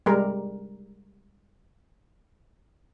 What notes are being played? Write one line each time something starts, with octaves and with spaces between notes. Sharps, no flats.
G3 G#3 A#4